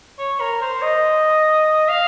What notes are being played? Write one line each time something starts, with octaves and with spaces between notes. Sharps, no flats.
C#5
A#4
C5
D#5
F5